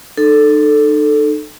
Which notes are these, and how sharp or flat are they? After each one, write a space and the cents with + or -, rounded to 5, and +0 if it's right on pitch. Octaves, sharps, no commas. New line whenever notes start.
D#4 -40 A4 +0